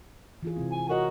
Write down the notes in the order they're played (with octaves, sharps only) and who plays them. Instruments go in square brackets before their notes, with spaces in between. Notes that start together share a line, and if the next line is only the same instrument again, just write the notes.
[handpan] E3 F4 G#4
C3 G#3 C4
[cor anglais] G#5
[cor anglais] F#4 [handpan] A#4 C#5 D#5